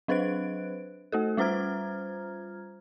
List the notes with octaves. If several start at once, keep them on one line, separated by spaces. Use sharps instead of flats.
F#3 D4 B4 C5 F#6 D7
A3 F#4 A4
G3 F4 C5 A#5 F6 G#6